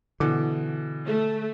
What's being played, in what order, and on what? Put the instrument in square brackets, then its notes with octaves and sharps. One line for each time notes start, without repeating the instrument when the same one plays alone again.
[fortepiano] B2 E3 D6 [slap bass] D3
[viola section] A3